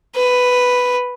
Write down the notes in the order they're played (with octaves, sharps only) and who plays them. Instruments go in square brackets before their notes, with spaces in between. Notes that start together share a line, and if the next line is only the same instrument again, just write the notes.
[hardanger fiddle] B4